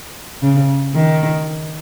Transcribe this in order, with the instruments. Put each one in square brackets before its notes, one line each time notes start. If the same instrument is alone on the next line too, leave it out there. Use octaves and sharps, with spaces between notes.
[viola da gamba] C#3
D#3